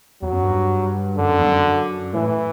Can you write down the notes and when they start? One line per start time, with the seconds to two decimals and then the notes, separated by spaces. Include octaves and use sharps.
0.22 E2 F#3
0.32 F#2
0.43 G2
1.17 F#2 D3
1.28 F#2
1.39 E2
1.44 G2
1.49 F#2
2.13 A2 E3